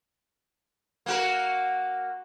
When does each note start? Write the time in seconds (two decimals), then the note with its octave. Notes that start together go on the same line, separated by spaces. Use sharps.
1.06 A#3 F#4 A#4